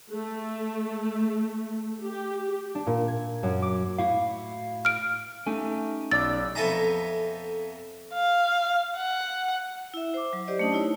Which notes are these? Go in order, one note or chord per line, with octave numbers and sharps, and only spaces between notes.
A3
G4
D4
A#2
G#6
F#2
D6
A2 E4 F#4 F5
F6 D7
A3 C#4 D#4 G4 G#5
B1 D5 D6 E6 A6
F2 B3 A4 E5 G#5 A#5
F5
F#5
E4 E5
C5 D6
F#3
G4 C5 D5 D#5
A3 C#4 D4 A5 D#6
D#4 E4 C#5